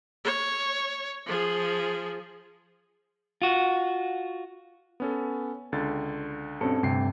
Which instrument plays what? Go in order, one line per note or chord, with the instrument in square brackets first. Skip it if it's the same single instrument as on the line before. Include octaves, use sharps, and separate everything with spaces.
[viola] C#5
F3 G#4
[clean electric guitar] F4 F#4
[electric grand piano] B3 C#4 A4
C#2 D3 A6
[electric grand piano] G2 B2 [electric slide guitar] C4 C#4 A4
[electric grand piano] D2 G5 C7 [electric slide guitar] G2 C3